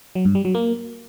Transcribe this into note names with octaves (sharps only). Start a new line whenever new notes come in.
F#3
G2
G3
F#3
A#3